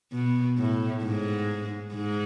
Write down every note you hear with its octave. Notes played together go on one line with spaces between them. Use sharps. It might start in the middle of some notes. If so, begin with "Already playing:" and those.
B2
A2
G#2
G#2